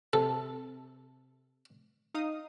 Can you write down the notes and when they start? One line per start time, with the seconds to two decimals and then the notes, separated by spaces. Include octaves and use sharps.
0.13 C3 A4
2.14 D#4 F5 D#6